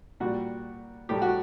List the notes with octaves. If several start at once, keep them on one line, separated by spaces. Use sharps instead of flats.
A#2 G3 F#4
A2 G3 G4
F#4